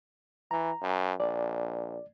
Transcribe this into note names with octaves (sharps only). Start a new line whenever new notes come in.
E3 A#5
F#2
A#1 D5